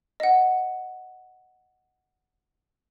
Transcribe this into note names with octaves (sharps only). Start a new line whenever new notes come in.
D#5 F#5